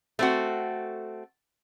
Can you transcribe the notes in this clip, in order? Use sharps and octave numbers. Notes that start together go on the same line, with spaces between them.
A3 C4 F#4